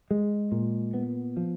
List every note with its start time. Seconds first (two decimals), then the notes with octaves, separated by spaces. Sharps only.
0.11 G#3
0.52 A#2
0.94 B3
1.37 F3